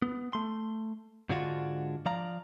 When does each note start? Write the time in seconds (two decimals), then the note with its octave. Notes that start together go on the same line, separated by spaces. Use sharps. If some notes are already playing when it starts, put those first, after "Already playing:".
0.02 B3
0.33 A3 C6
1.29 G#2 D3 G#3 D4 F4 F#4
2.06 F3 D5 F5 A#5